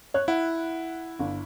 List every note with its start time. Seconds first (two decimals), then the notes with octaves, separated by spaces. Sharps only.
0.14 C#5 F#6
0.28 E4 F#5
1.19 G1